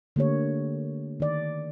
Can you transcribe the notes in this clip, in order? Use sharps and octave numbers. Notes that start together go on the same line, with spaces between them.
D3 A3 A#3 G4 C#5
D#3 D5